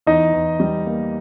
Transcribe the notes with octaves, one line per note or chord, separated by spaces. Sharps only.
E2 D#4 D#5
E2
G3
A#3